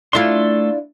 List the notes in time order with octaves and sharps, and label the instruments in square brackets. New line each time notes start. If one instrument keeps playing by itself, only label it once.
[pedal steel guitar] A3 A4 C6 [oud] D4 E4 F4